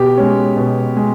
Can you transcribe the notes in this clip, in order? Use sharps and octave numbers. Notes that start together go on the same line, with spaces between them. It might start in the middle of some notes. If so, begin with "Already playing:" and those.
Already playing: B2 G4
G#3 C#4
B2
G#3